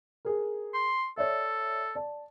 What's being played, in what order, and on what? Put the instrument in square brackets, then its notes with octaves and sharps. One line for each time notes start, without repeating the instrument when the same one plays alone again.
[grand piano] G#4 A#4
[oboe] C6
[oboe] A4 [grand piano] C#5 D5 E5
[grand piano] D5 A5